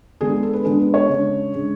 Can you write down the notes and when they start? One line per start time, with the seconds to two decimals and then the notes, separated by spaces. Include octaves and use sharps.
0.21 D3 G#3 B3 D4 G#4
0.43 A4
0.53 B4
0.65 D3 G#3 B3 D4 G#4
0.80 B4
0.94 C#5
1.08 C#3 G#3 D4
1.52 C#3 G#3 D4